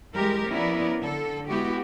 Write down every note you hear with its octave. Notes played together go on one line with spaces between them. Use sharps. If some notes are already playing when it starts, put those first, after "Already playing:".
E3 G3 G#3 G4 A#4
F3 B3 C#4 E4 A#4 D5
D3 A4
G#3 B3 E4 F#4 G4